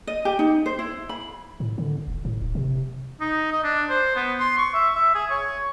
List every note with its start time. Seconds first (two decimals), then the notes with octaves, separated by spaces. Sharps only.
0.07 D#5
0.25 G4
0.39 D#4
0.66 C5
0.79 E4
1.09 B5
1.60 A2
1.78 D3
2.07 E1
2.25 A2
2.42 D1
2.55 C3
3.21 D#4
3.52 D#5
3.64 D4
3.90 C5
4.16 B3
4.40 C6
4.58 C#6
4.74 E5
4.95 E5
5.15 G#4
5.30 C#5